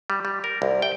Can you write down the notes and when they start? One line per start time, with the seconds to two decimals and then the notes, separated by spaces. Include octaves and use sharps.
0.10 G3
0.25 G3
0.44 A#4
0.62 C2
0.82 G5